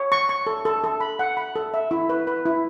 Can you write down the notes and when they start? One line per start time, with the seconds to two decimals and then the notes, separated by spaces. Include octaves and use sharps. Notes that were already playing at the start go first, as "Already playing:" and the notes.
Already playing: C#5
0.12 C#6
0.29 C#6
0.47 A4
0.65 A4
0.84 A4
1.00 B5
1.19 F#5
1.37 B5
1.56 A4
1.74 E5
1.91 E4
2.10 B4
2.27 B4
2.46 E4